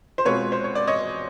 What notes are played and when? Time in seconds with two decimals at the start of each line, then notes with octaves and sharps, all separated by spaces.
0.18 C5
0.25 B2 G#3 C4 F4 B4 C#5
0.52 C5
0.64 C#5
0.75 D5
0.87 C#5 D#5